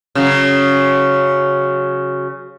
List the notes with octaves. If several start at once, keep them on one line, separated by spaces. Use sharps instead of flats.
C#3 F#3